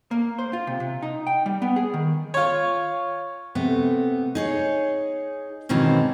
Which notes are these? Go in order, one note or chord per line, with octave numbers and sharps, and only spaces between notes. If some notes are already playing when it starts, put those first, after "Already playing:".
A#3
C5
F4
C3
C3
D#4
G5
G3
B3
G#4
D#3
F4 C#5
C3 A3 B3
D#4 G#4 C#5
G#2 B2 D#3 E3 C4 C#4